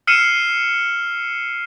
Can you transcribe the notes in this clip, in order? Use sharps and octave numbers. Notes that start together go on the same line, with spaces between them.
E6 F6 C7 C#7 D#7 E7